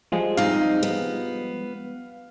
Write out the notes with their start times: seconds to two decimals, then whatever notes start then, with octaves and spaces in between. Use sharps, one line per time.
0.12 F3 G3 G#3
0.37 C3 D#4 F5
0.83 B3